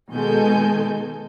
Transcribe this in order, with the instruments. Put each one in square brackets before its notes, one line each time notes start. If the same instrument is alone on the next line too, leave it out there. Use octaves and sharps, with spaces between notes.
[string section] B2 D#3 G#3 A4 G#5 G6